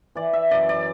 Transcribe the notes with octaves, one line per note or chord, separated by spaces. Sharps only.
E3 D5
E5
F#2 D5
D5